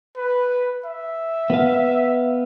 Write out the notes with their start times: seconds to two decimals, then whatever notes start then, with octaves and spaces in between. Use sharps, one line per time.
0.17 B4
0.85 E5
1.50 B3 B4 F5